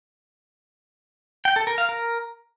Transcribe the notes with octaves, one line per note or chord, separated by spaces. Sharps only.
G5
A4
A#4
F5
A#4